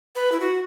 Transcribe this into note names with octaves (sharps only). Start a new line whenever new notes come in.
B4
E4
F#4